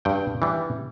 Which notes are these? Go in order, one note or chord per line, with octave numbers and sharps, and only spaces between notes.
G2 G5
E3 G3